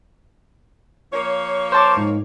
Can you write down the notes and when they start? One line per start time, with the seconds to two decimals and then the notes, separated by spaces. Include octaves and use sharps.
1.12 F3 A#3 C#5
1.72 C5 A5 D6
1.97 G#2